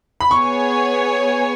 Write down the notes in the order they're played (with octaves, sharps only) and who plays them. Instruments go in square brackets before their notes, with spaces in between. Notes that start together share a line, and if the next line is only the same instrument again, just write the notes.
[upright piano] B5
[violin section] B3 G#4 C#5 G#5 [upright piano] C#6